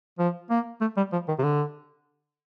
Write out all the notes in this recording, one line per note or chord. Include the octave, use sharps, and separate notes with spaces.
F3
A#3
A3
G3
F3
D#3
C3
D3